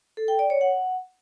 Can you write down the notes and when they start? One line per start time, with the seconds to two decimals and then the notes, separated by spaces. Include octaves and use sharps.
0.17 A4
0.28 G5
0.39 D5
0.50 C#5
0.61 F#5